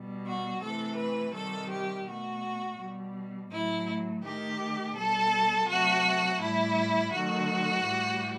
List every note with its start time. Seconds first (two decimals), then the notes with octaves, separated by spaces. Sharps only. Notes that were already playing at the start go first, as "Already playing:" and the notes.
Already playing: B2 G3
0.26 F#4
0.62 C3 E3 A3 A4
0.98 B4
1.34 C3 D#3 G3 A4
1.70 G4
2.06 B2 A3 F#4
2.79 B2 G3
3.51 A2 F#3 A3 E4
4.23 D#3 A3 G4
4.95 B2 G3 A4
5.68 C3 F#3 A3 F#4
6.41 A2 G3 E4
7.13 D#3 F#3 A3 F#4
7.85 A2 E3 G3